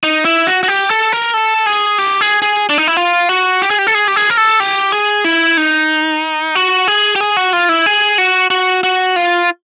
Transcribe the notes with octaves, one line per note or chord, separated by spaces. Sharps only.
D#4
E4
F#4
F#4
G4
A4
A#4
A4
G#4
G4
G#4
G#4
D4
D#4
E4
F4
F#4
G4
G#4
G4
A4
G#4
G4
G#4
A#4
A4
G4
G#4
E4
D#4
F#4
G#4
G4
G#4
F#4
F4
E4
G#4
F#4
F#4
F#4
F4